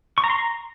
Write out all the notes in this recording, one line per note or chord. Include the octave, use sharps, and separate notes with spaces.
C#6
A#5
C6
A#5